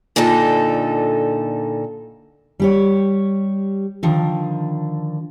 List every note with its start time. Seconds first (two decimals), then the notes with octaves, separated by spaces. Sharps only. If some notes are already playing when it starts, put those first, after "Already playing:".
0.16 A#2 D3 D#4 A4
2.60 G3 G4 C#5
4.03 D3 D#3 F3